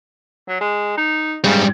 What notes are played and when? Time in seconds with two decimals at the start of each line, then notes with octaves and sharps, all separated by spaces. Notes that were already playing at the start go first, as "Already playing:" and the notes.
0.49 F#3
0.61 G#3
0.97 D#4
1.44 G#2 C#3 G3